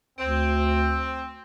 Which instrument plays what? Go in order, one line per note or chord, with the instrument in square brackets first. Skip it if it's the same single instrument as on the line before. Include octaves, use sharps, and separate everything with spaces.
[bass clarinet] D2 [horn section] C4